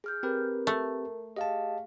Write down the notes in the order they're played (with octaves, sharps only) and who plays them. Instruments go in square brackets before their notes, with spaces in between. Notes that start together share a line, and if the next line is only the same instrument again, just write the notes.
[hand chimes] G#4 F6 G6
[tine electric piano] C4 G4 B4 [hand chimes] A#4
[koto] A3
[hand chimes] G4 G#4 F5 [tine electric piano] D#5 A5